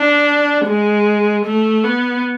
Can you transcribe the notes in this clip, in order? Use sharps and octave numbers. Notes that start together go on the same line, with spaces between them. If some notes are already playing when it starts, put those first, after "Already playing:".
Already playing: D4
G#3
A3
B3